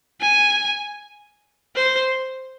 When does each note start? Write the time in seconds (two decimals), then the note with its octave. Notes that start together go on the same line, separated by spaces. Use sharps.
0.21 G#5
1.76 C5